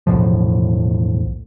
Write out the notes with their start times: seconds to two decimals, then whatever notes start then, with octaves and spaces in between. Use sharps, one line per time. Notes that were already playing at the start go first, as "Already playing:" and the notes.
0.07 B1 E2 A2 F3